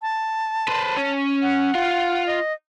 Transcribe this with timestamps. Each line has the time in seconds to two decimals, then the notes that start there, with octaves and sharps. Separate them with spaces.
0.02 A5
0.68 B4 C5
0.97 C#4
1.42 F#5
1.75 F4
2.26 D#5